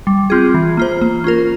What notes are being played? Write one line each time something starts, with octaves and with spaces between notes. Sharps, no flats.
G3
C4 F4 G#4
E3
A#3 F4 C5
A#3
C#4 F4 A#4